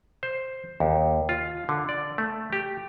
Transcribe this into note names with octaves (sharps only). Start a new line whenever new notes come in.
C5
D#2
F4
D3
D5
A3
G4